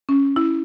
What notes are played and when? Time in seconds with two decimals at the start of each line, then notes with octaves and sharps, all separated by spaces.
0.09 C#4
0.36 E4